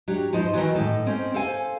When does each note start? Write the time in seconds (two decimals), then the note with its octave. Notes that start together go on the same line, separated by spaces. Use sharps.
0.08 F#3 D4 G4
0.33 F3 D#4 B4 C5
0.54 D#3 E3 F#3
0.75 A2 D#4 A4
1.06 C4 C#4 D#4
1.34 A4 C5 F5 G#5